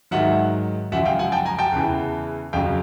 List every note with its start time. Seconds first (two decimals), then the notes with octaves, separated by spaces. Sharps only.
0.11 G#2 D#3 F#3 E5 F#5
0.92 F#2 C#3 F3 G#3 E5 F#5
1.05 F5 G5
1.19 F#5 G#5
1.32 G5 A5
1.45 G#5 A#5
1.59 G5 A5
1.72 E2 C#3 E3
2.53 F2 C#3 F#3 F5 G5